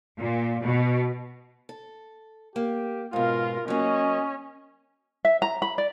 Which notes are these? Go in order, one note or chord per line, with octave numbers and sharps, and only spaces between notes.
A#2
B2
A4
A#3 G4
G#2 B2 F4 A#4 F5
F#3 A#3 C#4 D#5
E5
A#5
B5
D5